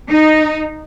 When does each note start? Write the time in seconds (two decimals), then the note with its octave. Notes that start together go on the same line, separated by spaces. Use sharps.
0.10 D#4